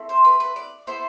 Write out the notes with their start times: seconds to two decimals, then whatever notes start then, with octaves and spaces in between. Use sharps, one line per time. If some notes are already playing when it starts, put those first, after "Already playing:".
Already playing: A3 C4 E4 A4
0.09 C5
0.25 B4
0.40 B4
0.56 D5
0.87 B3 E4 A4 C5